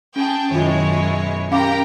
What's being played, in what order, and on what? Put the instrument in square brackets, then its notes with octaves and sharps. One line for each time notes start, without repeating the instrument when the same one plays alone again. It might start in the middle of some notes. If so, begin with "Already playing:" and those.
[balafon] C#4 [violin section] G#4 G5 A5
[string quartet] F#2 B2 G#3 [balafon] D#3 F4 [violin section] E4 C#5
[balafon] C#4 F5 D6 [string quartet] G4 [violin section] A#4 G5 A#5